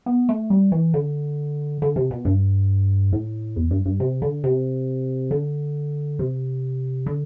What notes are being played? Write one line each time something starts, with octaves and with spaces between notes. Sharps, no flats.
B3
A3
G3
E3
D3
D3
C3
B2
G2
A2
E2
G2
G2
C3
D3
C3
D3
C3
D3